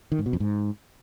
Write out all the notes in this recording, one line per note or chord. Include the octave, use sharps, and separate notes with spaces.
D#3
G#2
B2
F2
G#2